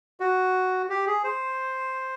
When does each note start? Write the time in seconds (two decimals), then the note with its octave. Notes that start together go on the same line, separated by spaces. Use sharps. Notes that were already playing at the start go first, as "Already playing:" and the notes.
0.20 F#4
0.89 G4
1.07 G#4
1.24 C5